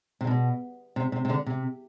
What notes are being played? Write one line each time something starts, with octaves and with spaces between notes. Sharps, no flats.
C3
B2
C3
C3
C3
D3
C3